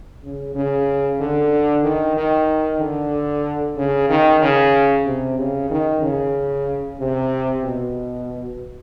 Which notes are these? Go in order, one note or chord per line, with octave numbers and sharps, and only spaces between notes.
C#3
C#3
D3
D#3
D#3
D3
C#3
D#3
C#3
C3
C#3
D#3
C#3
C3
B2